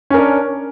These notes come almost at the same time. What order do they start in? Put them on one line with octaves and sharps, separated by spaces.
C#4 A#4 D4